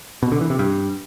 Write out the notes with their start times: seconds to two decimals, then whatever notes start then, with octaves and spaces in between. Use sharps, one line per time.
0.23 B2
0.32 D3
0.41 E3
0.50 C3
0.59 G2